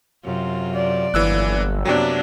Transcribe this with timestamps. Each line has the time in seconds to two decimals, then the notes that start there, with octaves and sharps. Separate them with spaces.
0.24 F#2 C3 F4
0.75 D5
1.14 G1 F2 E3 F#3 A#3 E6 F#6
1.85 F#2 C3 F#3 A#3 B3 D4